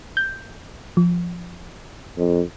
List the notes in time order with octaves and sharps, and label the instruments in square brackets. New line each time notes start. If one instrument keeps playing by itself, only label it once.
[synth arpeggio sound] G6
F3
[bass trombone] F2